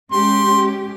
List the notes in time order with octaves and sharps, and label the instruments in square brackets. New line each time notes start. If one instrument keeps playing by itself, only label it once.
[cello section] G#3 C#4 G4 [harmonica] C6